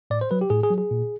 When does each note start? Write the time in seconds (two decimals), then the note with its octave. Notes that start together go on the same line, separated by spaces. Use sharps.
0.10 A2 D5
0.21 C5
0.31 F#3 B4
0.41 G4
0.50 A2 G#4
0.63 G#4
0.70 F#3
0.78 G#4
0.91 A#2